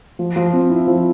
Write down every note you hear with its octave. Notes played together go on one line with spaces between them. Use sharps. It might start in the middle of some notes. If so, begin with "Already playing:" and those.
F3
F3
C4
E4
F3